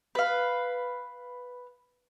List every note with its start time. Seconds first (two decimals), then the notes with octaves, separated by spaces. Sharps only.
0.15 B4 F5